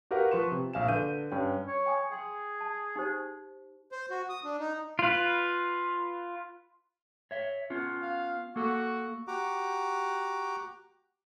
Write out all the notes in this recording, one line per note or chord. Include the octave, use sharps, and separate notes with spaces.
F#4 G4 A#4 B4 F5 F#5
F3 B4 C6 C#6 E7
C3
A#1 F5 G#5 E7
D3 B4 G6 D#7
G2 C#4 G5
C#5
G5 G#5 D#6
G#4 G5 C6
A5
D#4 G4 C5
C5
F#4
D#6
D4
D#4
F4 B4
C#5 E5
B3 C#4 F4
F5
A#3 F#4 A4
F#4 G4 F#5 A#5 D6